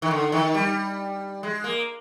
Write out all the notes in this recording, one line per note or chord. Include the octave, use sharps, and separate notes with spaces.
D#3
D3
D#3
G3
G#3
A#3